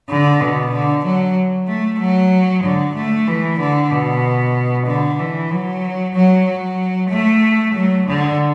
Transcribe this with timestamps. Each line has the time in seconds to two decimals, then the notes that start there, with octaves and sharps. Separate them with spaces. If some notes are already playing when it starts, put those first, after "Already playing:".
0.09 D3
0.41 B2
0.72 D3
1.04 F#3
1.68 A3
2.00 F#3
2.64 D3
2.96 A3
3.27 E3
3.60 D3
3.91 B2
4.87 D3
5.19 E3
5.51 F#3
6.15 F#3
6.46 F#3
7.10 A3
7.74 F#3
8.06 D3